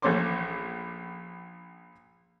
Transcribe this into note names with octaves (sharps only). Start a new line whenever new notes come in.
A#1 A3 C#4 C5 C6 D6